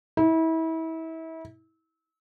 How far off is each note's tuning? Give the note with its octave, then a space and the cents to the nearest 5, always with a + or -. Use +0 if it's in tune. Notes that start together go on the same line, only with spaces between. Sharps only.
E4 -30